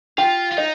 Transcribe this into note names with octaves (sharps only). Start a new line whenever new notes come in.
F4 G4
F4
D#4 D#5